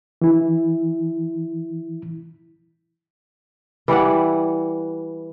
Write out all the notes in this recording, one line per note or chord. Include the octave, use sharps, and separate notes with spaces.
E3 E4
E3 G3 D5 F#5